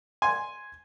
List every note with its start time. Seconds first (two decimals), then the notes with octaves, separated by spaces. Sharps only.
0.22 G#5 C6